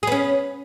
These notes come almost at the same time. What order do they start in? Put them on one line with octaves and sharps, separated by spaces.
G#4 B3 C#4